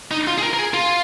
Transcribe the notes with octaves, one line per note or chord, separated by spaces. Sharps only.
D#4
F4
G#4
A#4
A#4
G#4
F4